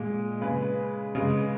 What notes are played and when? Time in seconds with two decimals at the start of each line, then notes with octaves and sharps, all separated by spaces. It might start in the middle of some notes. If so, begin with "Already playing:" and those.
Already playing: A#2 G#3
0.41 C#3 G#3 G#4 B4
1.15 C#3 G#3